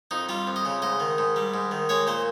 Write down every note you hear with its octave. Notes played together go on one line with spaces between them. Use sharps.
F2 D#4
G3 F4
F2
D#5
C#3
G#2 D#5
D#3
G#2
G3
G#2
D#3
G#3 C#5
A#2 C5